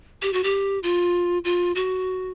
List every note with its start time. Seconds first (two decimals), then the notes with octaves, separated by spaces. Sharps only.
0.22 G4
0.33 F#4
0.44 G4
0.83 F4
1.45 F4
1.75 F#4